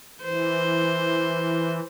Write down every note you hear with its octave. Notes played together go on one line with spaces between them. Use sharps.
E3 C5